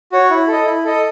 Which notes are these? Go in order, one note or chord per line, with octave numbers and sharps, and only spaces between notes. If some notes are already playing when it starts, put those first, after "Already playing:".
F#4 C#5
E4
A4 D#5
E4
A4 D#5